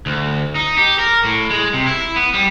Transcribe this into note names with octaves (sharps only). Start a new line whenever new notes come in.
D2
D#4
G4
A#4
A2
G#3
C3
E4
B3
G3